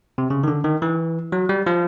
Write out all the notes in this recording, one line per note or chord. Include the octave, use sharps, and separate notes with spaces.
C3
C#3
D#3
D3
D#3
E3
F#3
G3
F3